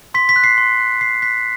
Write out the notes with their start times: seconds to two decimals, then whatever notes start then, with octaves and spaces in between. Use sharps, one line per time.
0.14 C6 B6
0.29 B6
0.36 F#6
0.44 C7
0.58 C6
0.80 F#6
1.01 C6 C7
1.22 F#6 B6